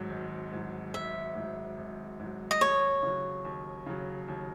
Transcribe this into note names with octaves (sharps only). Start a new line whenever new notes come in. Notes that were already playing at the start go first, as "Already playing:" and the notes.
Already playing: G#1 G#2 F#3
G#1
G#2 F#3
G#1 E5
G#2 F#3
G#1
G#2 F#3
D#5
D#2 C#5
C#3 F#3
D#2
C#3 F#3
D#2